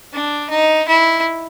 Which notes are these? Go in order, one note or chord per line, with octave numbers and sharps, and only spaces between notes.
D4
D#4
E4